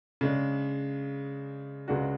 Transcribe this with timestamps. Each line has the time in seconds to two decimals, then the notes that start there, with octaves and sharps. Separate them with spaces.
0.21 C#3 G#3 D4
1.88 C#2 C#3 G#3 D4 F#4